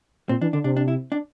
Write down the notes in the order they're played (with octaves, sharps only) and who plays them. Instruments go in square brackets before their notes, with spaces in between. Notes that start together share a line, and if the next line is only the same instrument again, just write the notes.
[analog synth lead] A#2 [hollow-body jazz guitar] C4
[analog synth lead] E3 [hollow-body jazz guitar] D4
[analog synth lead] D3 [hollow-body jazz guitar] D4
[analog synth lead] C3 [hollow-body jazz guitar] D4
[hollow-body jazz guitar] D4
E4
D4